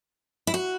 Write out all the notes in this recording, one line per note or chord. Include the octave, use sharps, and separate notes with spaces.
E4
F#4